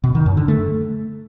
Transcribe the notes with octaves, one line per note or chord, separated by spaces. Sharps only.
B2
D#3
F#2
D3
A3